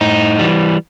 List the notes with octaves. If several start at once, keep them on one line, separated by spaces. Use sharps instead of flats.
A2 D#4
E3 G3